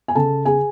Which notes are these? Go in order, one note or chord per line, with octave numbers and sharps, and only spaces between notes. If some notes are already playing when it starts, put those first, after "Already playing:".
G#5
C#3 A4 A5
G#4 G#5